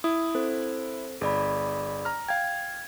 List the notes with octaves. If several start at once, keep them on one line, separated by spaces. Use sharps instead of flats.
E4 D#6
C4 A4 C5
G1 G#4 D5 B5
A#5 F6
F5 G5 G#6